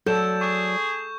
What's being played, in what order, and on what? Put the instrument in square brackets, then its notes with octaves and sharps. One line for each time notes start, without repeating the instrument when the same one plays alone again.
[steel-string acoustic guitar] F#3 D5 [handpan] A4 [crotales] G6 E7
[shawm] G#4 [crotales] C#6 G6